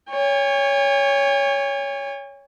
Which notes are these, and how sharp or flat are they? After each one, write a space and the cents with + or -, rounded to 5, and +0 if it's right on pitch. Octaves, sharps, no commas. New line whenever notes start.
C#5 +10 G#5 -45